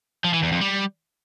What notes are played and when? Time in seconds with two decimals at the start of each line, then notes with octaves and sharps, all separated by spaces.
0.24 F3
0.34 E3
0.43 E2
0.52 F2
0.61 G3